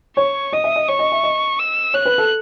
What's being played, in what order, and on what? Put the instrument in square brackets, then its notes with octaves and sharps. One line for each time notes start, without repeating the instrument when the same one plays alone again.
[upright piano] C#5 [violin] C#6
[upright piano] D#5 [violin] D#6
[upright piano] E5
D#5
[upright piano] C#5 [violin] C#6
[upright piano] D#5
E5
D#5
[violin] E6
[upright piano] C#5 [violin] F#6
[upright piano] B4
A4